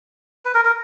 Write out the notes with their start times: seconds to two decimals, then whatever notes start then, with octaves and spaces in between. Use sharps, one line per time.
0.45 B4
0.54 A#4
0.65 A#4